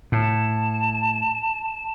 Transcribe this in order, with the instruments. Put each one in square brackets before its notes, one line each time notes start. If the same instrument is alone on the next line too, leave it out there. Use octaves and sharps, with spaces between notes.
[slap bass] A2 [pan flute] A5